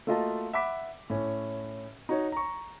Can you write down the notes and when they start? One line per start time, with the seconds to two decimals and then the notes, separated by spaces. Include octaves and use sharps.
0.07 A3 A#3 F4 F#4 D#5 A5
0.53 E5 F#5 B5 D6 B6
1.10 A2 C#4
2.09 D#4 F#4 C#5 D#5
2.32 A#5 C#6